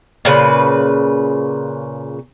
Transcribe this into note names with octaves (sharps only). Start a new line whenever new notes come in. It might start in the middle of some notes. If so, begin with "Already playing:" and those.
A#2 C#3 B4